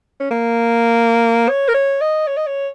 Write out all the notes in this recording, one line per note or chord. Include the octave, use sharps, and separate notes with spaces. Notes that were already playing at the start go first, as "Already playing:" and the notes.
C#4
A#3
C#5
A#4
C#5
D#5
C#5
D#5
C#5